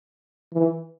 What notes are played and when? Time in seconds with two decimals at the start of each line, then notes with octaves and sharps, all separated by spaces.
0.53 E3